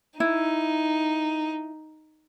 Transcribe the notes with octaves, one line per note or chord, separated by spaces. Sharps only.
D#4 E4